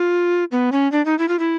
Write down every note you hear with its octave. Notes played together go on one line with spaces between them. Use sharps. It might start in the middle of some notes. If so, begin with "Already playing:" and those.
Already playing: F4
B3
C#4
D4
D#4
E4
F4
E4